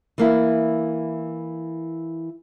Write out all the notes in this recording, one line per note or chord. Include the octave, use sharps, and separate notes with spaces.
E3 A#3 E4